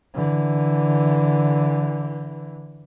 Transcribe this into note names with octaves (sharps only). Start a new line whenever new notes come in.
D3 E3